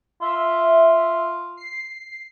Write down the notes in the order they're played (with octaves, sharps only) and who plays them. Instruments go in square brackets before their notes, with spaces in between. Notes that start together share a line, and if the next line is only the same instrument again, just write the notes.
[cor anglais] F4 [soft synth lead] E5
[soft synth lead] C7